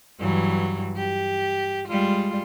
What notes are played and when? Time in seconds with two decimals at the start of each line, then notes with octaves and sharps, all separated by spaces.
0.20 G2 E3 F#3
0.97 G4
1.88 G3 G#3 F4